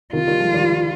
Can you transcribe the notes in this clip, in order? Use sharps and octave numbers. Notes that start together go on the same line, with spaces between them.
C3 D#3 F4
D#3 G3
F3 G#3
D#3 G3